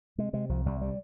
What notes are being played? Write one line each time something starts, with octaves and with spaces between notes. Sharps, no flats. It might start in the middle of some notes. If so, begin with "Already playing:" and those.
C3 G#3
C3 G#3
C2 F3
C2 G3
C3 G3